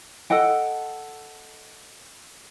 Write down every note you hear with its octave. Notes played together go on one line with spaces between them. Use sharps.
A4 D#5 F#5 G5